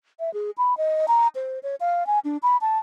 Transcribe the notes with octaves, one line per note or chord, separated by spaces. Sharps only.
E5
G#4
B5
D#5
A#5
C5
C#5
F5
G#5
D4
B5
A5